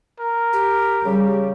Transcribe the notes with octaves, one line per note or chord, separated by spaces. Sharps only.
A#4
G4
C#3 G3